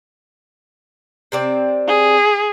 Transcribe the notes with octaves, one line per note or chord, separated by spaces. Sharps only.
C3 C4 D5
G#4